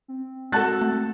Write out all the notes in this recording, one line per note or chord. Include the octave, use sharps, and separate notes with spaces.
C4
G#3 F#4 A4 A5 F#6 A6
A3